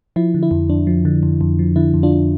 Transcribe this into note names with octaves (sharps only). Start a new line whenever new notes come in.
F3 E4
D3
E4
F2
F2 D4
F3
D3
F2
F2
F3
D3 E4
F2
D4 F4
F2